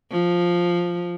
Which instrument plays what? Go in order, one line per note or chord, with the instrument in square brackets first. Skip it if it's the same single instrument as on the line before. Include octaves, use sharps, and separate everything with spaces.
[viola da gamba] F3